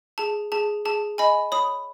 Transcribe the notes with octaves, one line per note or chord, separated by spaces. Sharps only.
G#4 A5
G#4 A5
G#4 A5
D#5 G#5 B5
C#5 B5 D#6